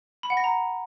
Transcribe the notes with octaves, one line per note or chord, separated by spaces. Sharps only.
B5
F#5
A#6
A#5